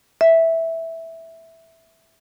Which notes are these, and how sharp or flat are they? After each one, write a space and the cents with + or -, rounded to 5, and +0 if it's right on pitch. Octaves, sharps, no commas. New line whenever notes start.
E5 -5